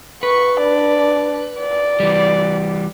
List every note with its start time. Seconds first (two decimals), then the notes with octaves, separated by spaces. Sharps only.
0.23 B4 C#6
0.59 D4 D5
1.60 D5
2.00 E3 G3